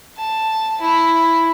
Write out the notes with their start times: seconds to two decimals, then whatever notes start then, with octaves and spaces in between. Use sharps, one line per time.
0.17 A5
0.81 E4